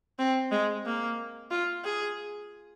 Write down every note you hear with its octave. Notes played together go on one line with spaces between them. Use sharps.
C4
G#3
A#3
F4
G#4